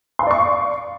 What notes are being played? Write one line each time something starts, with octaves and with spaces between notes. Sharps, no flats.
D5 F5 C6 C#6